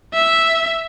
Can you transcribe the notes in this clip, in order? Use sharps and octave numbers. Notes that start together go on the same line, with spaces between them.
E5